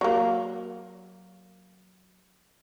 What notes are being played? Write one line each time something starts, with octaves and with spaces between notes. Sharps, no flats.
F#3 A#3